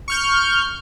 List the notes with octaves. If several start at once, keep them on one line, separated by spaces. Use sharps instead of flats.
C#6 F6 G6